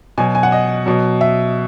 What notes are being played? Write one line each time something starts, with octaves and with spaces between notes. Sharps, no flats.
B2 F#3 G#5
G#5
F#5
D#5
B2 F#3
E5